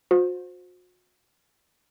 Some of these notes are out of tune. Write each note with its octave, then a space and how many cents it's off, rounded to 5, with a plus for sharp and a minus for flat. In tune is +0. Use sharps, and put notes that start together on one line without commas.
F#4 -40 C5 +0